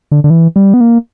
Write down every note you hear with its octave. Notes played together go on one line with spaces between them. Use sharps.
D3
D3
E3
G3
B3
A#3